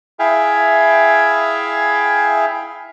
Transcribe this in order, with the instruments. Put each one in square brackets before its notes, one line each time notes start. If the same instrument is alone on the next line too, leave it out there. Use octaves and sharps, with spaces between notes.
[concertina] E4 G#4 E5 F5 G5 G#5